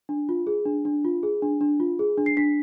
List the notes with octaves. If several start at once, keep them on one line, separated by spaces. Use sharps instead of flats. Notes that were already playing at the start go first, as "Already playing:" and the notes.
D4
F4
G#4
D4
D4
F4
G#4
D4
D4
F4
G#4
D4
C7
D4 B6